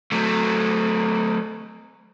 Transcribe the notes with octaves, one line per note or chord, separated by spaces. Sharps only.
F#3 A3